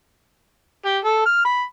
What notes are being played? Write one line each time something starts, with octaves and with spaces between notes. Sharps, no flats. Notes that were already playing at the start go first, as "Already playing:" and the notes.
G4
A4
F6
B5